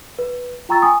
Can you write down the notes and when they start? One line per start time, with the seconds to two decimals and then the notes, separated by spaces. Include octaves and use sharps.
0.19 B4
0.69 F4 G5 A#5 C#6 E6 A6
0.82 G#5 D#6